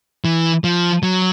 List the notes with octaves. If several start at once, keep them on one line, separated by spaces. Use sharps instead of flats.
E3
F3
F#3